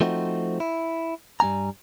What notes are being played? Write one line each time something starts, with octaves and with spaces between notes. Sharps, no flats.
F3 A3 C4 D#4 F#4
E4
G2 G3 B3 G#5 A#5